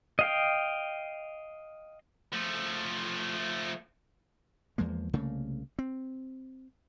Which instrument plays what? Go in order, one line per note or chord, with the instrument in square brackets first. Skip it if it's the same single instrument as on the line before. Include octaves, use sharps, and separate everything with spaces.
[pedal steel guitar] D#5 F5 G5
[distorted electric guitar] F3 A3
[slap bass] E2 F3 G#3 A#3
C2 C#3 A3 A#3
C4